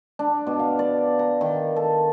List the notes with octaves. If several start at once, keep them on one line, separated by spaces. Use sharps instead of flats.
D4
B2
F5
D5
A#5
D#3
A4